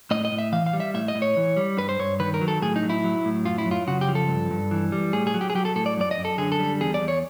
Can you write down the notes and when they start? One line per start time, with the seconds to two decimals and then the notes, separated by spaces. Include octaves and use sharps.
0.11 A2 D#5
0.25 D#5
0.32 A2
0.38 E5
0.52 E3 F5
0.66 F5
0.73 G3
0.80 E5
0.94 A2 E5
1.08 D#5
1.15 A2
1.22 C#5
1.37 E3
1.57 G3
1.78 G2 B4
1.89 C5
1.99 G2 C#5
2.20 D#3 B4
2.34 A#4
2.41 F#3
2.48 A4
2.62 A2 G#4
2.76 D#4
2.83 F#3
2.90 E4
3.04 F#3
3.25 A2
3.45 F#2 F4
3.58 E4
3.66 F#2
3.71 F4
3.87 C#3 F#4
4.01 G4
4.08 F3
4.15 A4
4.29 G2
4.51 G2
4.71 E3
4.92 G3
5.13 A2 G#4
5.27 G#4
5.34 F#3
5.41 G4
5.50 G#4
5.55 F#3 G4
5.65 A4
5.76 A2 A4
5.86 D5
5.97 F#2 D5
6.11 D#5
6.18 F#2
6.25 A4
6.38 D3 G#4
6.52 A4
6.60 G3
6.80 E2 G#4
6.94 D5
7.01 E2
7.08 C#5